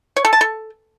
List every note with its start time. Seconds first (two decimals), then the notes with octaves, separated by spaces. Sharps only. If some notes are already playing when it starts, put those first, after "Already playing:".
0.16 C#5
0.25 A4
0.33 A5
0.41 A4